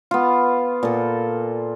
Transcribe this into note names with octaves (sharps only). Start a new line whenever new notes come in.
B3 F4
A#2 A4